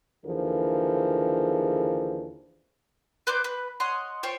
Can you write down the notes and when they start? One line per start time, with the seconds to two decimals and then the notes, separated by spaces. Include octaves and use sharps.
0.25 D#2 D3 E3 F3 G#4 A#4
3.27 B4 C5 D5 D6
3.44 B4
3.80 C#5 D#5 F#5 C6
4.23 F4 C5 C#5 G5